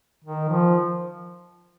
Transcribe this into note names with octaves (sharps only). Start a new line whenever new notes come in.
D#3
F3